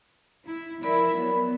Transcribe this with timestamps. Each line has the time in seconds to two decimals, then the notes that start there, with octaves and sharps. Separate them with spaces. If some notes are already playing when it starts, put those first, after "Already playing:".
0.46 E4
0.83 F3 E4 A#4 D5 E5 B5
1.15 F#3 B3